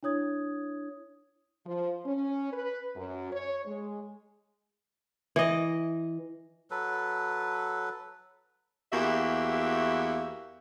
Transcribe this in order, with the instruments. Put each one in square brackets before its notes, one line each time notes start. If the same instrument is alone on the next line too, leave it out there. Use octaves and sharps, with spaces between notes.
[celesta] D4 E4 C#5 D#6 G#6
[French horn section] F3
C#4
B4
F#2
C#5
G#3
[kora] E3 D#5
[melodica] F#3 A4 B4
[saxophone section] E2 A#3 F#4 G4 E5